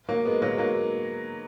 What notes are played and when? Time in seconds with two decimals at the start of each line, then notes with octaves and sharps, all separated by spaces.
0.09 F#3 A#3
0.25 G#3 B3
0.42 F#3 A#3
0.52 G#3
0.58 F#3 A#3